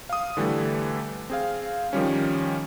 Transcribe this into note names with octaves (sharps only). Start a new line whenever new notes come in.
F5 D#6
D3 E3 G3 A3
C4 G#4 F5
D#3 F3 G3 C#4